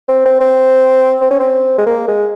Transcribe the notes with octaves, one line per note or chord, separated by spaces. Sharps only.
C4
C4
C4
C4
C#4
C4
G#3
A#3
G#3